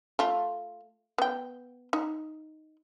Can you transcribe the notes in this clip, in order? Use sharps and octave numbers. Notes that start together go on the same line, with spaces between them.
A3 F4
B3 G5
D#4